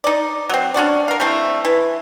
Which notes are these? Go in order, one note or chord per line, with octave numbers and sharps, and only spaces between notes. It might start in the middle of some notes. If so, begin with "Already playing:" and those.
D#4 D5
F#3 C4
C#4 D4 F#4 D5
A#4 F5
G3 A3 C4 E4
E3